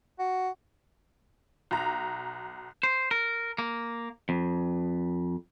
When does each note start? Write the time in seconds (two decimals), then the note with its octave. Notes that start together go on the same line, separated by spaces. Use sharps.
0.19 F#4
1.71 B1 A#5
2.83 C5
3.11 A#4
3.58 A#3
4.29 F2